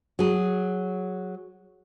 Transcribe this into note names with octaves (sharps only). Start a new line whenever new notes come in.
F#3 G#4